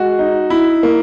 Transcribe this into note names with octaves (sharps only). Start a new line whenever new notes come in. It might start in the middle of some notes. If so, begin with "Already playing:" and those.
Already playing: G#3 F#4
D#4
E4
A#3